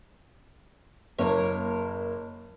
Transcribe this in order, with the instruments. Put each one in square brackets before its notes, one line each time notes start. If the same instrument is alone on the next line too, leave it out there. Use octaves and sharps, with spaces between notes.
[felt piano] F#1 A#3 [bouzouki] A#4 C#5